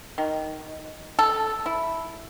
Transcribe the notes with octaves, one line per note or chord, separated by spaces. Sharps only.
D#3
A4
E4